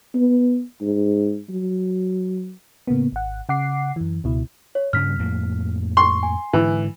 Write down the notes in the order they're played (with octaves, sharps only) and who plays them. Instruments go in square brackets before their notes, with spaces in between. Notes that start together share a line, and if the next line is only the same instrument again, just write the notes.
[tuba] B3
G#2
F#3
[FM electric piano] A2 C#3 A#3 B3
G#1 F#5
C#3 F#5 D6 C7
F#2 E3
C#2 B2 E4
[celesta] C#5
[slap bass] G2 C#3 G3 [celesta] F6 B6
[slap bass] F2 A2 A#3
[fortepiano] C6 [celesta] C#6
[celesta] G#5
[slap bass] G#2 D3 [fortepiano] E3